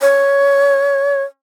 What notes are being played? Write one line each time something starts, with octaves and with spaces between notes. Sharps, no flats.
C#5